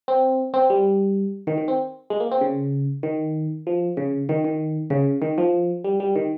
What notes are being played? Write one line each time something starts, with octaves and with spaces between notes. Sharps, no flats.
C4
C4
G3
D#3
D#3
C4
G#3
A#3
C4
C#3
D#3
F3
C#3
D#3
D#3
C#3
D#3
F3
G3
G3
D#3